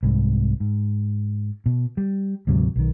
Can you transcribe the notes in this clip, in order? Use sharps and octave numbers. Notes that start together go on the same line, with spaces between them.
C2 G#2
G#2
B2
G3
D2 G#2 C3 F#3
B1 D#3